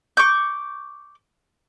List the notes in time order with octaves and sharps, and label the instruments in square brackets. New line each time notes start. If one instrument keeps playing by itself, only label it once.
[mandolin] C#6 D6 G6